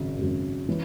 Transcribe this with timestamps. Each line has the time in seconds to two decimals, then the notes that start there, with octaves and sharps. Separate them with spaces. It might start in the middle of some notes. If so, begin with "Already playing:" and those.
Already playing: G#1 F#2 C#3
0.19 G#1 F#2 C#3
0.69 E3 C#4